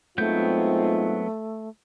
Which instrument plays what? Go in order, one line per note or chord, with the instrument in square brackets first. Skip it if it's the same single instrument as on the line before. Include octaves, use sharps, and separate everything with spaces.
[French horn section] G#2 C4 F4 [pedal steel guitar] F#3 B3 G6 [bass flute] A3